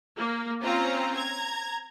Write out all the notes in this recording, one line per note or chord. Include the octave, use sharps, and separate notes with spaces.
A#3
C4 C#4 F4 A#5
A#5 G#6